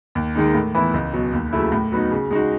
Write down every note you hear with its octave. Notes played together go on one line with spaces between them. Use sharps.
D#2
D#3 G#3 D#4
A2
E3 B3 E4
C#2
B2 F#3
D#2
C#3 F#3 A3 E4
A2
F#3 B3 D#4 F#4
C#3
G#3 D#4 F#4